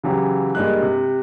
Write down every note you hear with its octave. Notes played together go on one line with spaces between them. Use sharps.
C#3 E3 F#3 G4
G2 G3 G#3 A#3 F#6
C3